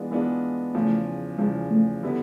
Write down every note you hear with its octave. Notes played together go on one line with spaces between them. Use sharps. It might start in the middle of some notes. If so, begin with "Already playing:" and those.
Already playing: E3 G#3 B3 D4 F4
E3 G#3 B3 D4 F4
E2 C#3 F3 A3
E2 C#3 F3 G#3
A3
D3 G3 B3 E4